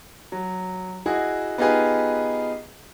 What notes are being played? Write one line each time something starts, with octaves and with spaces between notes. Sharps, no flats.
F#3
E4 F#4 G#4 D#5
B3 D#4 F4 G4 G#4 B4